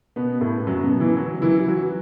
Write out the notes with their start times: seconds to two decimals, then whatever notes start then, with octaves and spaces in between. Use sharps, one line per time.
0.16 B2 B3
0.41 A2 A3
0.67 F#2 F#3
0.83 B2 B3
1.00 E3 E4
1.17 F#3 F#4
1.42 E3 E4
1.60 E4
1.67 F#3 F#4